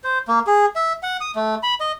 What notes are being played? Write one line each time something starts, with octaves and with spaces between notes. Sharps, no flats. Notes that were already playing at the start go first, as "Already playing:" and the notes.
C5
A#3
G#4
E5
F#5
D#6
A3
B5
D#5